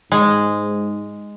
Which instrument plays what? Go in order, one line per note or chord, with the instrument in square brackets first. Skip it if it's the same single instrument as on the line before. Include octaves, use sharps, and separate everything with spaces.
[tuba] G#2 [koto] G#3